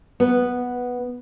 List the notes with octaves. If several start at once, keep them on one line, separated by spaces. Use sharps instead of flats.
B3